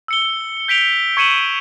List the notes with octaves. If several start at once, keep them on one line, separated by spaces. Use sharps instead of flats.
E6 C#7 G7
G6 B6 D7 F7 G7
C#6 G#6 C#7 D#7 E7 F#7